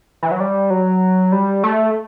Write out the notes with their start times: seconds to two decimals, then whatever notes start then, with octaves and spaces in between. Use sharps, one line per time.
0.23 E3
0.31 F#3
0.40 G3
0.70 F#3
1.32 G3
1.64 A3